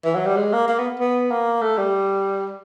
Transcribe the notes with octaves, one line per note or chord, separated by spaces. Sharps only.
E3
F#3
G3
G#3
A#3
A#3
B3
B3
A#3
A3
G3